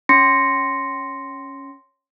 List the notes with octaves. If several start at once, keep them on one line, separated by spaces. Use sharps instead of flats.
C#4 C6 A#6 C#7